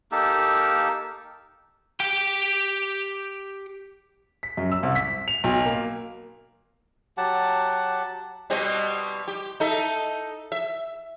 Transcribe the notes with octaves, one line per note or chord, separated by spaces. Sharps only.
A#3 D#4 G4 A4
G4 G5
B6
F#2
E6
C2
B6
F7
B1
A#3
F#3 G4 F#5 A5
B2 G3 C4
G4
D#4 A4 E5
E5